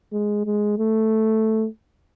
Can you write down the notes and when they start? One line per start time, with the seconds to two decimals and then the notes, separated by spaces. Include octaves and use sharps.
0.12 G#3
0.45 G#3
0.78 A3